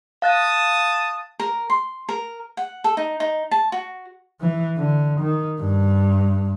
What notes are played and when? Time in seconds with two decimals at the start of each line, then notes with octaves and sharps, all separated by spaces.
0.22 F5 A5 D#6 F#6 A6
1.40 A#4
1.70 C6
2.09 A#4
2.57 F#5
2.84 A4
2.97 D#4
3.20 D#4
3.51 A5
3.72 F#4
4.41 E3
4.77 D3
5.20 D#3
5.60 G2